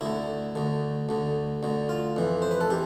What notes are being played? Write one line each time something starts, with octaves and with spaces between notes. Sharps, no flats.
D2 D3 E4
D2 D3
D2 D3
D2 D3
F4
F2 E3
C5
B4
A4
E3 G4